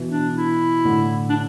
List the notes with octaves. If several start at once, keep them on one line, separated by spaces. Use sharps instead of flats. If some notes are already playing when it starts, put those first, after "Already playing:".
Already playing: B2 E3
D4
E4
A2 D3
D4